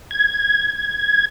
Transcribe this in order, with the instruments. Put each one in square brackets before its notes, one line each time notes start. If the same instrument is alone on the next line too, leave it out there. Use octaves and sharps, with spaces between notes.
[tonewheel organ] G#6